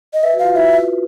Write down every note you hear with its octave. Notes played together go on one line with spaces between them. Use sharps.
D#5
B4 E5
F#4
F4 F5
E4 E5